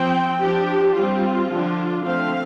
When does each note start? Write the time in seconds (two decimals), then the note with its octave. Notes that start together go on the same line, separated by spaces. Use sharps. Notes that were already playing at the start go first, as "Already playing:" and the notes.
Already playing: F3 C4 G5
0.41 F3 D4 G4
0.95 G3 C4 F4
1.50 D3 F3 D4
2.03 D3 F3 A3 C4 F5